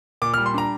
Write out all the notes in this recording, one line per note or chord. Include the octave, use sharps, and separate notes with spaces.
A#2 D6
F6
G3
C6
D4 A#5